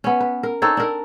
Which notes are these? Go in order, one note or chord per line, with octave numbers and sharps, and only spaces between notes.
B3 C#4
B4
A#4
C4 D#4 A4 C#5
D4 A#4